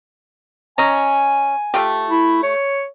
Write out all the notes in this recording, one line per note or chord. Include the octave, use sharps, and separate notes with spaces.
C#4 D#5 G#5 A#5
A3 F4 G4
E4
C#5